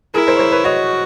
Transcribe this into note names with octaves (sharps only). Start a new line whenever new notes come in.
E4 G#4 A#4
A#4 C5
C#5
A#4 C5
B4 C#5
F#4 C#5 D#5